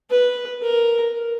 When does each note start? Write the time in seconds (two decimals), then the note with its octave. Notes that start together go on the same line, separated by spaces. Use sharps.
0.10 B4
0.63 A#4